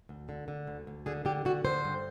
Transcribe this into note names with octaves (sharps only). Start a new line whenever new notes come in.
D2
D3
D3
D2
D2
D3 G#4
D3 G4
D3 F#4
D3 C5
G2